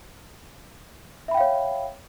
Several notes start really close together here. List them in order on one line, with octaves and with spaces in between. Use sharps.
E5 B5 G5 F5 C#5